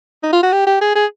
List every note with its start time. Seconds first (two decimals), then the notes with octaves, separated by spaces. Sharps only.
0.23 D#4
0.32 F4
0.43 F#4
0.52 G4
0.66 G4
0.81 G#4
0.95 G#4